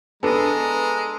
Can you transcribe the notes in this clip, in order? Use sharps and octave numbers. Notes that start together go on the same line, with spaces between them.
G#3 B3 D4 A4 A#5